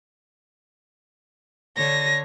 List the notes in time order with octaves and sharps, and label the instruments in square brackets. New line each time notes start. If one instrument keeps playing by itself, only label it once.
[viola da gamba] D3 C#5 [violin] A#6